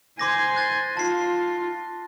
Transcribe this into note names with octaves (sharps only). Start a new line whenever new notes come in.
C5 G#5 C6 D6 A#6
F#6 A6
F4 A5 C7